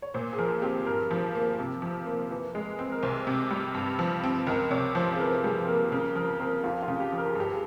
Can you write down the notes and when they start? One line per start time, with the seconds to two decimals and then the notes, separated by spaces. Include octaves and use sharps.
0.02 C#5
0.14 A#2 C5
0.33 G#4
0.38 F3 A#4
0.62 C4 G4
0.86 G2 A#4
1.11 F3
1.35 A#3
1.59 C3
1.82 F3
2.06 A#3
2.31 E3
2.55 G#3
2.79 C4
2.92 A#4
3.03 C2 C5
3.27 C3
3.51 G3
3.74 G2
3.99 F3
4.24 C4
4.47 C#2 A#4
4.71 C3 C#5
4.95 F3 C5
5.13 G#4
5.20 E3 A#4
5.43 G3 G#4
5.68 A#3 A#4
5.92 C#3 A#4
6.15 F3 A#4
6.40 C4 A#4
6.64 F2 F4
6.82 F4
6.88 C#3
7.00 G4
7.12 F3
7.18 A#4
7.29 G#4
7.35 G2 G4
7.51 G#4